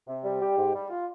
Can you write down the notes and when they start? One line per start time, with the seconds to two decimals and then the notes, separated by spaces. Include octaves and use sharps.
0.08 C3
0.24 G3
0.41 G4
0.57 G#2
0.74 G3
0.90 F4